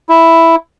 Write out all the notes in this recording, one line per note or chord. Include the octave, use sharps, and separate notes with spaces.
E4